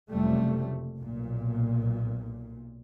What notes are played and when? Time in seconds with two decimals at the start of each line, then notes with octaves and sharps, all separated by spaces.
0.10 F#1 F2 C3 G3 A3
0.99 B1 A#2